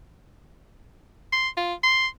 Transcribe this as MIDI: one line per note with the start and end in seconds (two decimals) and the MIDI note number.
1.32 1.48 84
1.57 1.74 65
1.83 2.07 84